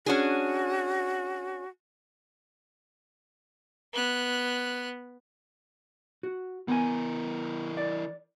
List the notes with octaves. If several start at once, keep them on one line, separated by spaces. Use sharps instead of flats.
C#4 D4 F#4 G#4
B3 F#6
F#4
E3 B3 A#4 G#5
D5